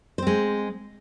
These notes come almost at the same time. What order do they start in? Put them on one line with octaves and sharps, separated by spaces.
C5 C4 G#3